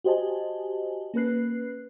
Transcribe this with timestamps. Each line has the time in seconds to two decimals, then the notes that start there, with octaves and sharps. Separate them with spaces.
0.04 F#4 G4 C5 D#5 G#5 A5
1.14 A#3 C#4 B4 F#6 C7